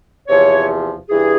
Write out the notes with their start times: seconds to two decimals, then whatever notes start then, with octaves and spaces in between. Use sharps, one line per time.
0.28 E2 C3 F3 C#5
1.10 G2 E3 G#4